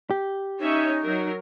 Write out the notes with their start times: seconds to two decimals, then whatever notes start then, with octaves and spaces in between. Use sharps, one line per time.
0.11 G4
0.60 C#4 D#4 C#5 E5
1.03 F#3 A#4